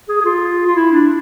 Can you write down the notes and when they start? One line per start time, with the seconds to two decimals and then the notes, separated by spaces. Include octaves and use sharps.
0.09 G#4
0.21 G#4
0.25 F4
0.67 F4
0.75 E4
0.92 D4